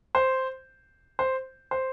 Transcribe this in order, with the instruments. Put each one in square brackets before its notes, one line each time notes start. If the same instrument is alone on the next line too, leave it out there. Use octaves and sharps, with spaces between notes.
[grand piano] C5
C5
C5